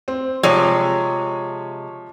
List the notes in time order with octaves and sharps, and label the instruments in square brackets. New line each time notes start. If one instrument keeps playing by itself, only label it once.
[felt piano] C4
[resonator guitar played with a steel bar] C3 G#3 [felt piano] F3 [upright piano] C#5